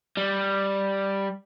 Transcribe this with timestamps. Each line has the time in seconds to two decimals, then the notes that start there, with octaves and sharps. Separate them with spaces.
0.17 G3